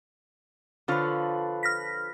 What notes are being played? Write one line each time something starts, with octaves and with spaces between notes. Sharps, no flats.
D3 F3 F4 B4 C#5
F6 A#6 B6